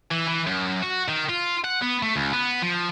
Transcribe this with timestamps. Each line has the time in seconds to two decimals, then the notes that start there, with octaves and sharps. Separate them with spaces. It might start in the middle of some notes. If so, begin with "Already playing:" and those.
0.11 E3
0.28 E3
0.47 F#2
0.82 F#4
1.08 D#3
1.29 F4
1.64 F#5
1.82 B3
2.03 A3
2.16 C#2
2.33 B3
2.62 F3